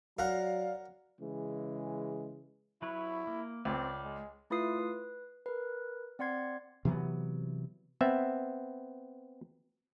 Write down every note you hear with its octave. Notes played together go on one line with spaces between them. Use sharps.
F#3 A#4 D5 F5 F#5 A#5
C#3 E3 G#3
F#3 E4 B4 C#5
A#3
C#2 C4 D5
G#3
A3 E4 F4 B4 D#6 C7
B4
A#4 B4
C4 D5 F#5 C6 G#6 C7
C3 E3 F#3 B3
B3 C4 E5